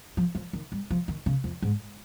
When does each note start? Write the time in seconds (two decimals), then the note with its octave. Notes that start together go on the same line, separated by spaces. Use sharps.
0.17 F3
0.35 F3
0.53 D#3
0.72 G3
0.91 F3
1.08 D#3
1.26 C#3
1.44 F2
1.62 G#2